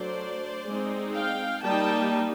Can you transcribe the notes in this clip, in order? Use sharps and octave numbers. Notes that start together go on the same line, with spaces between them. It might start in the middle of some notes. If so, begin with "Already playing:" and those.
Already playing: F#3 A3 D4 C5 D5
G#3 C4 D#4
F5 G5
G3 A#3 D#4 G5 A5